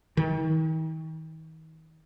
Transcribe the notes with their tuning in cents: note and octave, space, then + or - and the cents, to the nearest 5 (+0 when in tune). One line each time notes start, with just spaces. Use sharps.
D#3 +40